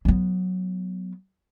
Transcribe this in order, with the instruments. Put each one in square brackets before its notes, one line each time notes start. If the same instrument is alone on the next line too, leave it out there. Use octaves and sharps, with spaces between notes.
[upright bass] F#3 B3